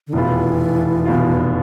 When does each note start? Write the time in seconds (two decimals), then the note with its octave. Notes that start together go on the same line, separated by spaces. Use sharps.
0.07 D3
0.13 F1 E2 B2 E3 B3 F4
1.05 F1 E2 B2 B3 F4